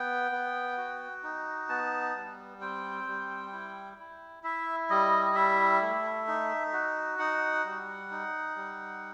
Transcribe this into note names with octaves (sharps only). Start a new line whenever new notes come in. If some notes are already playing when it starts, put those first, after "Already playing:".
Already playing: B3 G5
B3
F#4
D#4
B3 A5
G3
C4 G5
G3
E4
E4
E4 E5
G3 D#5
D#5
E4 E5
A3
D#4
F#4
D#4 F#5
G3
D#4
G3